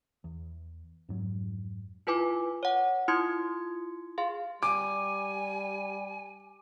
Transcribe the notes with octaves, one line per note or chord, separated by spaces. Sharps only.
E2
F2 G#2 F#3
E4 F4 B4 G#5 D6
C#5 F#5
E4 F4 C6 D#6 G#6 C#7
G#4 F5 C6
G3 G#5 D6